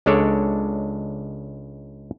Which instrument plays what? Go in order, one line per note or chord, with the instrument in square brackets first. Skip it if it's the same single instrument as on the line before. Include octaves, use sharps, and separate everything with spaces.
[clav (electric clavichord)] C#2 G#3 D4 A4 C#5 D5